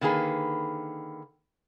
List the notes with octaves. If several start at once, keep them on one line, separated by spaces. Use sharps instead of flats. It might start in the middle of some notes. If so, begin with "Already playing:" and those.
D3 D#3 A#3 G#4 B4